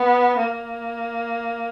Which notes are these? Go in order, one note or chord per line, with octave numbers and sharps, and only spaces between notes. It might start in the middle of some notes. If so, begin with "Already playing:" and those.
Already playing: B3
A#3